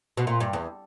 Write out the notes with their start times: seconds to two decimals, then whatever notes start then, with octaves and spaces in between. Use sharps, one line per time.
0.17 B2
0.27 A#2
0.40 G2
0.53 E2